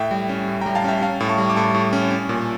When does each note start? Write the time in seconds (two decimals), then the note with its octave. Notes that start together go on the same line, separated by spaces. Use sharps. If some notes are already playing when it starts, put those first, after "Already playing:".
Already playing: A2 E5 G5
0.11 G3
0.29 C#4
0.48 A2
0.61 G3 G5 A#5
0.75 F5 A5
0.84 C#4 E5 G5
1.02 C#4 F5 A5
1.20 A2
1.29 A5 C#6
1.38 G3
1.50 D6
1.56 A2 A5 C#6
1.74 A2
1.93 C#4
2.11 C#4
2.29 A#2